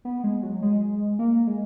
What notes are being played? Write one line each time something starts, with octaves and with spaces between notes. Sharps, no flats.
B3
G#3
F#3
G#3
A#3
G#3